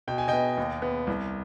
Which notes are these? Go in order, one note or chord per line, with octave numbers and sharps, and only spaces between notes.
B2 G5
G#5
B3 D#5 G5
D#2
B3
C2